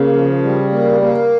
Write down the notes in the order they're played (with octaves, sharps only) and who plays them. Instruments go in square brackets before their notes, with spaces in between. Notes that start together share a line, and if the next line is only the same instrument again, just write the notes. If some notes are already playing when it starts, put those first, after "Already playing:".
Already playing: [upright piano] C#3 [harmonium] A#3
[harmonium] F3
G3
A#3
A#3